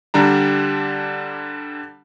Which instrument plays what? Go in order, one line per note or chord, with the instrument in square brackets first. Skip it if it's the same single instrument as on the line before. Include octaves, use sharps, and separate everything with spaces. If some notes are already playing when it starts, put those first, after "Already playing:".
[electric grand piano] D3 G3 D4 A#5